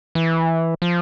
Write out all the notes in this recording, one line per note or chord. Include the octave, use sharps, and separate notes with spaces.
E3
F3